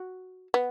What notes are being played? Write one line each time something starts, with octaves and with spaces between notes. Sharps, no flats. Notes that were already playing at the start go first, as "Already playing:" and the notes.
Already playing: F#4
B3